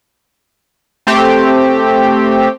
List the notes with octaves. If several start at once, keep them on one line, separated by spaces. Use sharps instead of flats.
A3 C4 G4